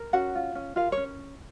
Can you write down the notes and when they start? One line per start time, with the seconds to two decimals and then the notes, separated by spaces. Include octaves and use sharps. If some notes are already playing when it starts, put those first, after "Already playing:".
Already playing: A#4
0.13 C#4 F#4 F#5
0.35 F4
0.55 C#4
0.76 F4 A#4 F5
0.92 C#5
0.97 C#4